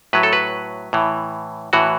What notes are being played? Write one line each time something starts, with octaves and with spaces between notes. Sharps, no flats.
A2 F#3 B4
A4
B4
A2 E3
A2 E3 F#4